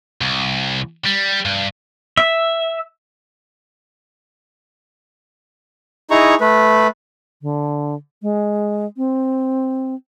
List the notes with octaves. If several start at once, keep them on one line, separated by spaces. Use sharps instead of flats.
C2
G3
G2
E5
D#4 E4 G#4 A#5 C#6
A3 B4
D3
G#3
C4